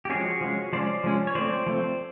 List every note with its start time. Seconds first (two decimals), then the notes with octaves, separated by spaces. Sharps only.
0.05 G4
0.10 F3 G#3 C#4 F#4 G#4
0.41 F3 G#3 C#4
0.73 F3 G#3 C#4 C5 D5
1.04 F3 G#3 C#4
1.27 C#5
1.35 F3 A3 C4 C5 D5
1.66 F3 A3 C4